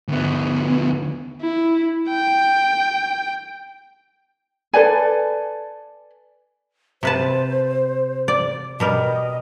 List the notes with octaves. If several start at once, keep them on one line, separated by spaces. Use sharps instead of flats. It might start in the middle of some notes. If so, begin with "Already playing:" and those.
D2 B3
E4
G5
A4 B4 D5 G#5
C3 B4 C5 A5
D5
B2 G3 A#4 D#5